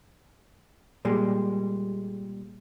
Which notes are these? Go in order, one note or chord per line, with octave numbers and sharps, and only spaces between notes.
A#2 G3 G#3